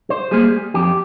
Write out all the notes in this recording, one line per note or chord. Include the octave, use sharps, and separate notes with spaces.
C5
G3 A#3 G#4
F2 G4